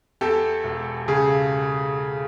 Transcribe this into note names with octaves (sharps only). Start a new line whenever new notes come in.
E2 G4 A4
E1
C#3 G#4